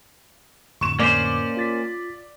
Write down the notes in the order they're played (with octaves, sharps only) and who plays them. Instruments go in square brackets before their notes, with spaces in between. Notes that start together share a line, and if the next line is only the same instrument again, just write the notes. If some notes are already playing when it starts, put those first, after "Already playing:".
[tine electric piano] F2 A2 D3 [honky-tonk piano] C#6 E7
[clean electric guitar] A#3 C#4 C5 [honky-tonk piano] D5
[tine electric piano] F4 A6 B6